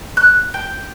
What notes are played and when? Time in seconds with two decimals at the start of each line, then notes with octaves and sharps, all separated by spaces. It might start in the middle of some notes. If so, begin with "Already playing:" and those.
0.17 F#6
0.54 G5